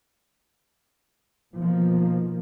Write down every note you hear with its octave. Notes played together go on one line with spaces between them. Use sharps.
B2 D#3 F3 A#3